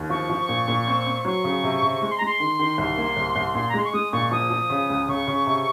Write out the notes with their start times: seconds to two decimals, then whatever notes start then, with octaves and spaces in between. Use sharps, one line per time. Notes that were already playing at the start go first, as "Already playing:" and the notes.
Already playing: D#2
0.10 F3 C#6
0.30 F3
0.49 A#2
0.68 A#2
0.87 C4
1.06 C4
1.25 F#3 C#6
1.44 C#3
1.64 C3
1.82 C3
2.01 G#3 C#6
2.10 C6
2.18 A#5
2.21 G#3 C6
2.40 D#3
2.59 D#3
2.78 C2 C6
2.97 A#3
3.17 C2
3.36 C2
3.54 A#2 C6
3.69 A#5
3.74 G#3 C6
3.84 C#6
3.93 G#3 D#6
4.12 A#2 C#6
4.25 C#6
4.31 F3 D#6
4.50 F3
4.70 C#3
4.90 C#2
5.08 C#3 C#6
5.28 C#3
5.46 C3